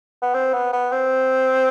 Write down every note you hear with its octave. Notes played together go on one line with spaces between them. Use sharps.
B3
C4
B3
B3
C4